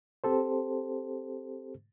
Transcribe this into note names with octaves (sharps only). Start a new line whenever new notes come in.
C4 G4 A4 C5